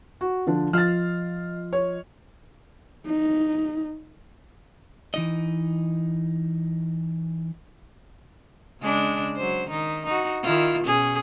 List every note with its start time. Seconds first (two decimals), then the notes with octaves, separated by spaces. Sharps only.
0.21 F#4
0.47 D3 F3 D4
0.73 F3 F4 D#5 F6 A6
1.73 C#5
3.06 D#4
5.14 E3 D#4 D#5
8.80 C#3 G#3 D4
9.37 F#3 C5
9.69 D#3 D#4
10.06 D#4 F#4
10.43 D#3 E4 F4
10.83 B2 C#4 G#4